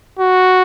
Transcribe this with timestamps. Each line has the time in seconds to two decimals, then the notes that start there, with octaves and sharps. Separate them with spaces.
0.20 F#4